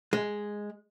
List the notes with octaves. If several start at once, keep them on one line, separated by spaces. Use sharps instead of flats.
G#3